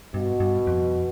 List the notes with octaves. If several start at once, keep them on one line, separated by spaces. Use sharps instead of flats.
G2 B2
G2
F2